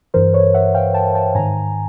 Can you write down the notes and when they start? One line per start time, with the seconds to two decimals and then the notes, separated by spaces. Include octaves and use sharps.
0.14 G2 E3 A#4 C5
0.34 B4 C#5
0.54 E5 F#5
0.74 F5 G5
0.94 G5 A5
1.14 G5 A5
1.35 G#2 D#3 G#5 A#5